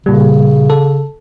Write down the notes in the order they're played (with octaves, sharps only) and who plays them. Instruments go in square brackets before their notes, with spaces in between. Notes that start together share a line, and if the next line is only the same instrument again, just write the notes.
[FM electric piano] A#2 G3 [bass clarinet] C#3
[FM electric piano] A4